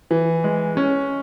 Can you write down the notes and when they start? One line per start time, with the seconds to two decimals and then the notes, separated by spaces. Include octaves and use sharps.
0.11 E3
0.44 G#3
0.77 C#4